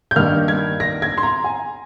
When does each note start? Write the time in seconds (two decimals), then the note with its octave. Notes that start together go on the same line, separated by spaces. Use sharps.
0.11 G6
0.16 G2 D#3 A#3 D#4 F6
0.48 G#6
0.80 A#6
1.02 G#6
1.18 C6
1.23 A#5
1.44 G#5